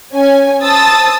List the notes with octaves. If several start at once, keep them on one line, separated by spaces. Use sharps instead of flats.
C#4 G#5
C5 A5 D#6 E6 A6